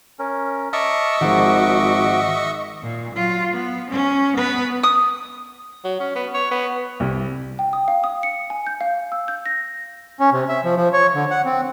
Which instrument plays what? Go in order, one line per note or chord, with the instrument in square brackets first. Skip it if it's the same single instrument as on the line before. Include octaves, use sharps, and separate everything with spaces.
[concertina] C#4 A#4
[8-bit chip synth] D#5 E5 C#6 [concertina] A5 D6 F6
[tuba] G#1 [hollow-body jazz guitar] D#3 F3 G#3 [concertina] F#4 D6
[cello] A#2
F#3 F4
B3
C#4
B3 B4
[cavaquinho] D#6
[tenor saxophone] F#3
C#4
B3
C#5
B3
[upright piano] C2
[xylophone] G5
D#6
F5
D#6
C#7
G#5
G6
F5
E6
G6
A#6
[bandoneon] C#4
C3
E5
F3
F3
C#5
D3
F#5
C4